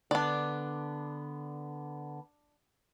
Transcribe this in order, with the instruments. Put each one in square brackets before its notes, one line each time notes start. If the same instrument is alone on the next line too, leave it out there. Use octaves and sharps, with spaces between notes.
[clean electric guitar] D3 B3 [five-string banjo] D4 D5